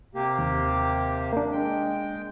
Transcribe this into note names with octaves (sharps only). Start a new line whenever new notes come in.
C3 A#3 G4
D#2
A#3 D4
G#3 G5